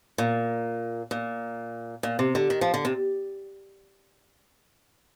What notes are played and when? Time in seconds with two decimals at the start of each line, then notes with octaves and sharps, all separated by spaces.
0.18 A#2
1.11 A#2
2.03 A#2
2.19 C3
2.35 D3
2.50 D#3
2.61 F3
2.74 D3
2.85 C3